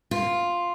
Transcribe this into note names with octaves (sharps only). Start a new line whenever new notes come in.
F4